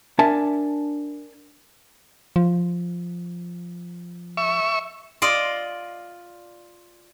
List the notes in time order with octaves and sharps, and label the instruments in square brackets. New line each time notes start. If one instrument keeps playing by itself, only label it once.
[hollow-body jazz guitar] D4 A#4 E5 G#5 A5
[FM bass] F3
[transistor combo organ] E5 C#6
[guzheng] F4 D5 D#5